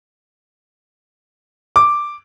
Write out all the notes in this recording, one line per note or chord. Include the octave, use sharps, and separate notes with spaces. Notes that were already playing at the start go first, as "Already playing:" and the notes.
D6